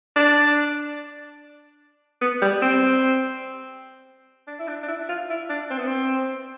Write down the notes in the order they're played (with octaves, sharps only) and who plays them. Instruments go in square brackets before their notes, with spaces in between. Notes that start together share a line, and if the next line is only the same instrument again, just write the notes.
[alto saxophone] D4
B3
G3
C4
D4
E4
D4
D4
E4
F4
E4
D4
C4
B3
C4